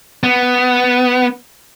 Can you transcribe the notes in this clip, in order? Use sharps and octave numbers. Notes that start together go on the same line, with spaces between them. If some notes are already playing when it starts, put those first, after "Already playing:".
B3